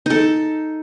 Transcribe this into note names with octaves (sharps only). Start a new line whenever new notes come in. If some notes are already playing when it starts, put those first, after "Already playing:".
D#4 A4